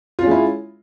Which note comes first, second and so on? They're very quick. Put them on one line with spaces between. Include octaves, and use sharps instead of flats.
F4 C#4 G#3 E4